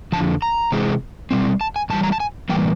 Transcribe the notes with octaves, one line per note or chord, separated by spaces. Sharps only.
F2 D3 F3 A5
A#5
C3 E3 G#3 C4
B2 G3 C4
A5
G#5
G2 E3 G3 A5
A#5
A5
G#5
A2 E3 G3 A#3 G5